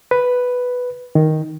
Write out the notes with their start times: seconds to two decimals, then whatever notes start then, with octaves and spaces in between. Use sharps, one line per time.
0.11 B4
1.15 D#3